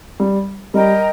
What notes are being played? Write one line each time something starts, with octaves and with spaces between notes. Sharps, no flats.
G3
G3 A#4 D#5 G5